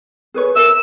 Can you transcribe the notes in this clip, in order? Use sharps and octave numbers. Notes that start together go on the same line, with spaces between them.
G#4 B4 C#5
A#4 E5 E6